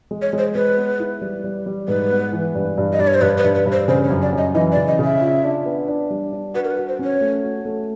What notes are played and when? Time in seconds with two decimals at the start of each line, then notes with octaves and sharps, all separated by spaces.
0.11 G#3
0.22 C#5
0.33 G#3
0.38 C5
0.55 G#3 B4
0.77 B3
1.00 E4
1.21 G3
1.44 G3
1.66 G3
1.88 G#2 B4
2.11 B3
2.33 E3
2.55 G2
2.78 G2
2.93 D#5
2.99 G2 D5
3.07 C#5
3.14 C5
3.21 G2 B4
3.38 B4
3.44 G2
3.55 B4
3.66 G2
3.72 C5
3.88 C#3 C5
4.04 C#5
4.10 F#2
4.22 D5
4.33 F#2
4.38 D#5
4.55 E3 D#5
4.72 D5
4.77 C#3
4.88 D#5
4.99 C#3
5.04 E5
5.21 F4
5.44 D4
5.66 B3
5.88 D4
6.10 G3
6.32 D4
6.54 F#4 B4
6.64 A#4
6.71 B4
6.77 F#4
6.88 C5
6.99 C#4 C#5
7.21 A3
7.43 F#4
7.65 A3